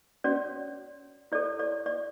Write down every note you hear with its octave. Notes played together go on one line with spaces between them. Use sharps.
C#4 F#4 C#5 D5
E4 A4 C#5 D5
D5
D5